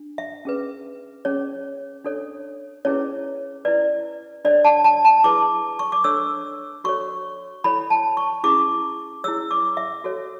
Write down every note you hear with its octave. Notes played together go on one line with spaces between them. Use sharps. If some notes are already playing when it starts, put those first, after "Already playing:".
Already playing: D4
E5
C#4 G#4 B4
C#4 G#4 C#5
D4 A4 C#5
C#4 E4 G#4 B4 C#5
E4 B4 D5
D4 A4 C#5 D5
A5
A5
A5
E4 G#4 B4 D6
C#6
D6
D4 A4 C#5 E6
F#4 A4 C#5 C#6
E4 A4 C#5 B5
A5
C#6
C#4 E4 G#4 D6
E4 G#4 C#5 E6
D6
E5
F#4 A4 C#5